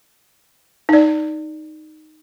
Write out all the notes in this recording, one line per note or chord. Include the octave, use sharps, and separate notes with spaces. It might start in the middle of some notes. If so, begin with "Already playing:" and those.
D#4 D5